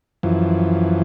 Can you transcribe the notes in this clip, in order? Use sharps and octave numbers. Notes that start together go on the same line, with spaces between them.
F#2 E3 F3